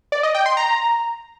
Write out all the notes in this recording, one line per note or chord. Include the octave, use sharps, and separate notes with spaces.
D5
D#5
G5
C6
A#5